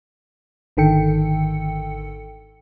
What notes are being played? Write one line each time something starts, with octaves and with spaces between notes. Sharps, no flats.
G#1 D3 D#3 A4 G5 C#7